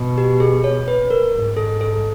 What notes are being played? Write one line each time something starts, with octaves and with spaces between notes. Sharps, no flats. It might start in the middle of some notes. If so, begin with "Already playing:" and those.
Already playing: B2
G4
G#4
C#5
B4
A#4
G#2
A4
A4